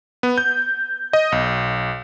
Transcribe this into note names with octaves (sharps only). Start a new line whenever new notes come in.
B3
G6
D#5
B1